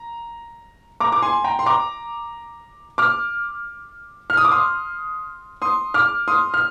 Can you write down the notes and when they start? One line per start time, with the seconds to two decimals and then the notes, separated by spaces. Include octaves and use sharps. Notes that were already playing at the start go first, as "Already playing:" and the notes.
Already playing: A#5
1.00 A#5 D6
1.12 D6
1.22 G#5 C6
1.44 G5 A#5
1.59 C6
1.66 A#5 D6
2.98 D6 F6
4.30 F6
4.37 D#6
4.45 D6
4.52 C6 D#6
5.62 C6 D#6
5.94 D6 F6
6.28 C6 D#6
6.54 F6